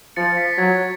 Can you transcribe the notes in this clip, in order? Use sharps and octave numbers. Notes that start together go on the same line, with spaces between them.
F3 A6 C#7
B6
F#3 G#6